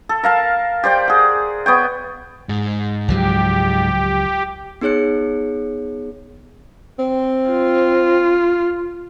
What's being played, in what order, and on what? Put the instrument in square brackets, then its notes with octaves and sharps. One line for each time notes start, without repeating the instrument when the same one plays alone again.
[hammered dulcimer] A4
A#4 F5 A5
G4 C5 D5 G5
G#4 F#5
B3 C#5 G5
[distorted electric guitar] G#2
[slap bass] C#2 F3 F#3 [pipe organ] G4
[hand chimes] B3 D#4 G#4 C#5 F#6 C#7
[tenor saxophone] C4
[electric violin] F4